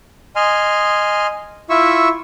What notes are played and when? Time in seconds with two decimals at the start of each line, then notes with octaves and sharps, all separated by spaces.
0.36 D#5 G#5 C6 F6
1.70 E4 F4 E5 C#6 E6